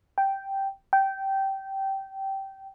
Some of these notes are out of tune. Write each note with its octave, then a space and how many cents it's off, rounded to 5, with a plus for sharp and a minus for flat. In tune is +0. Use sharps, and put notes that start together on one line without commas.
G5 -5
G5 -15